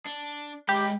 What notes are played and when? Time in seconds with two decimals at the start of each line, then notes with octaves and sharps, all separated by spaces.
0.06 D4
0.69 G#3 G4 B5